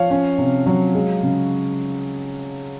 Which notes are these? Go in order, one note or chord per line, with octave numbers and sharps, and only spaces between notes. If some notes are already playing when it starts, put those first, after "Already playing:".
Already playing: F3 C#5 F5
C#4
C3
F#3
G#3
C#3